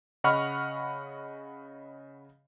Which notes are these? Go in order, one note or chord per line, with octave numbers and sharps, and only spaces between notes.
C#3 D#5 F#5 B5 C#6 F6